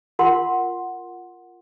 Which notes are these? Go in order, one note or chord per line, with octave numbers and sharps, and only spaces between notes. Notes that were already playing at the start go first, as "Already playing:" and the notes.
F4 A#4 F#5 C6